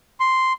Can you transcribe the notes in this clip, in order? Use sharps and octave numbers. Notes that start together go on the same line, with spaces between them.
C6